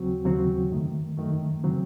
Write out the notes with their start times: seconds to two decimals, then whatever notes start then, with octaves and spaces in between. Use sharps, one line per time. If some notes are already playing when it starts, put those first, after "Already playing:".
Already playing: D#2 C#3 F#3 C4 F#4
0.25 D#2 C#3 F#3 C4 F#4
0.72 F#2 D#3 A3
1.18 F#2 D#3 A3
1.64 C#3 F#3 C4